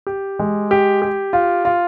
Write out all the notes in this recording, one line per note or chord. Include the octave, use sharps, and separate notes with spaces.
G4
G#3
G4
G4
F4
F4